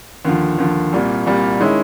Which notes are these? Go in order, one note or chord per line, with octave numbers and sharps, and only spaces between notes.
D#2 D3 F3
D#2 D3 F3
C2 A#2 G3
C2 A#2 G3
D#3 G#3 C#4 E4